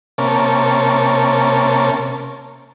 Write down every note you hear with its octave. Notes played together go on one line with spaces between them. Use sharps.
C3 A#3 C#4 A5